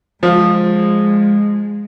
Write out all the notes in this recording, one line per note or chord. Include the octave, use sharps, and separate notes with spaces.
F3 G#3